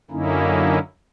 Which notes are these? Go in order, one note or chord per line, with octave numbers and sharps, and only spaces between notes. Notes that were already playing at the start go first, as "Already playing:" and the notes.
F#2 D3 A#3 C#4 D#4 E4